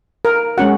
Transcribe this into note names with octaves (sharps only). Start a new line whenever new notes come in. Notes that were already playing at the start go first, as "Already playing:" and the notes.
A#4
G#3 C#4 F#4 F#5